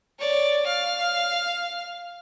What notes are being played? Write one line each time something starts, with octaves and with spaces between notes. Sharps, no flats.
C#5 D5
F5